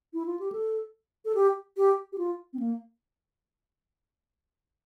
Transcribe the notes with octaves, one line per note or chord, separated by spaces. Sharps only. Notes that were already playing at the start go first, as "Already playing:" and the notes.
E4
F4
G4
A4
A4
G4
G4
G4
F4
C4
A#3